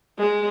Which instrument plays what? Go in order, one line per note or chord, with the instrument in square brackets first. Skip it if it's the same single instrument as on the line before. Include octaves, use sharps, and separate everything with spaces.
[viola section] G#3